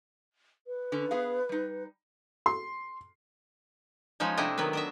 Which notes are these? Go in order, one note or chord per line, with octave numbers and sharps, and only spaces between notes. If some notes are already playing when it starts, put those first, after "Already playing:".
B4
D3 C#4
B3 G#4 F5
G3 D#4
C6
F3 G#3 C#4 D#4
C3 G3 A3 D4 E4 D#5
D#3 F#3 B3 B4
D4 D#5 E5